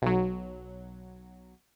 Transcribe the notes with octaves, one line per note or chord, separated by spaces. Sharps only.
B1 F#3